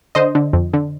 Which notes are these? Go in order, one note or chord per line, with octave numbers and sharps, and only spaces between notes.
D3 C5 D#5
D3
F2
D3